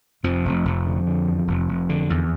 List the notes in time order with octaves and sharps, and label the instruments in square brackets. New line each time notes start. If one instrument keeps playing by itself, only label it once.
[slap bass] F1 F2 F3
F1
F1
D3
D3
E2
F1
F1
D3
E2